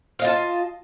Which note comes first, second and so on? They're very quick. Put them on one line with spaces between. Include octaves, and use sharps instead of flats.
F5 D#5 F4 A5